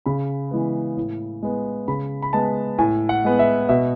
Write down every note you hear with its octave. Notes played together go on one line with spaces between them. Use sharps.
C#3 B5
E3 G#3 B3
A2
G#3 B3
C#3 B5
B5
G#3 B3 A5
A2 G#5
F#5
G#3 B3
E5
B2 E5